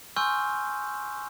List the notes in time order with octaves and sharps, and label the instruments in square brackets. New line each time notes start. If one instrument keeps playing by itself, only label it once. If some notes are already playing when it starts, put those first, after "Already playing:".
[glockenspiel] G#5 C6 C#6 E6 F6 G6